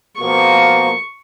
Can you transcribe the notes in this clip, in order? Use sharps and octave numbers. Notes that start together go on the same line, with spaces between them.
B2 F3 A#3 C#6